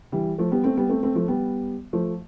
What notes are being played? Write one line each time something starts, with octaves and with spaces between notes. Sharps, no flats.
E3 G3
F3 A3
G3 B3
A3 C4
G3 B3
A3 C4
A3 C4
F3 A3
G3 B3
F3 A3